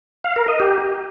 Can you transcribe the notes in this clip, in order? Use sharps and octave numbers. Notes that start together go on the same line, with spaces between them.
F5
A#4
D#5
G4